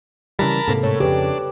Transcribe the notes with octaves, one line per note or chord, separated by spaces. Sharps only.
C#3 E3 G3 A#4 A5 B5
G#2 C3 A#3 A4
A2 C#5
F2 C#3 D4 G4 B4